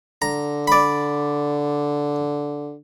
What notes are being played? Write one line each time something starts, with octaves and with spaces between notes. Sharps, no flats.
D3 A#5
D5 B5